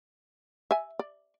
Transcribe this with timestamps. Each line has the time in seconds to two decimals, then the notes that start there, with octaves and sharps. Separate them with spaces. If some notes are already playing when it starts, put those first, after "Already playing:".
0.71 E5 G#5
0.99 D5